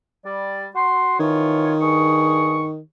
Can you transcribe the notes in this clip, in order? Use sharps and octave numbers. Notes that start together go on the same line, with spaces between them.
G3 D5
F#4 C6
D#3 E3 F4 C#5
G2 G#4 C#6